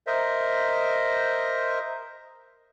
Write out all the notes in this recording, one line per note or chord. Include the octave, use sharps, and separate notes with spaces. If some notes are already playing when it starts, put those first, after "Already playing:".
A#4 C5 D#5 E5